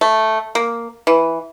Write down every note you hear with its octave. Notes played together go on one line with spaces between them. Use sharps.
A3
A#3
E3